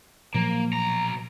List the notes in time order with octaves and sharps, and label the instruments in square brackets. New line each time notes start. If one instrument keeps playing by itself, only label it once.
[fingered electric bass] A#2 F3 F#3 [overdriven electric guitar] A#3
[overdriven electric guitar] B1 A#5